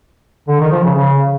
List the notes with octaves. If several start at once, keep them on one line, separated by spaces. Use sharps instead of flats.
D3
D#3
F3
C#3
C#3